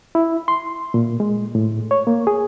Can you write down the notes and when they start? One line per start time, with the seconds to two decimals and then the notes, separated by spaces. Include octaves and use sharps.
0.15 E4
0.48 C6
0.94 A#2
1.20 G#3
1.55 A2
1.91 C#5
2.07 A#3
2.27 G#4